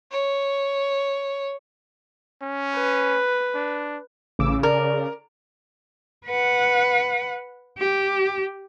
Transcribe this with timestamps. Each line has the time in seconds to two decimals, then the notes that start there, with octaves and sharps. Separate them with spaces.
0.12 C#5
2.42 C#4
2.76 B4
3.54 D4
4.39 A1 C#3 D6 E6
4.63 A#4 D5
6.26 B4 F#5
7.78 G4